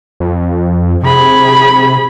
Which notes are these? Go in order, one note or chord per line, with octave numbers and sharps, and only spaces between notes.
F2
C3 G#4 B5